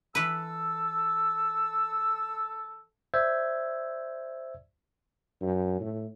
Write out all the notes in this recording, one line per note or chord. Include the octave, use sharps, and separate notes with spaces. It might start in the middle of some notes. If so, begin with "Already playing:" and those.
E3 A4 B4 E6
C5 D5 E5 E6 G6 G#6
F#2
A2